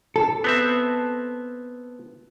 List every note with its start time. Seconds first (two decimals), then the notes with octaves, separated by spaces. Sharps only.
0.16 A4
0.44 B3 C4 E5